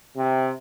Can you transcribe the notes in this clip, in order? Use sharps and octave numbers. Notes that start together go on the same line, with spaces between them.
C3